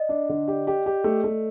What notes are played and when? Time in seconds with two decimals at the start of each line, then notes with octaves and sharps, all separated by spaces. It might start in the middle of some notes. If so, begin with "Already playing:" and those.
Already playing: D5 D#5
0.09 D4
0.29 D3
0.48 G4
0.67 G4
0.86 G4
1.04 A3
1.24 A3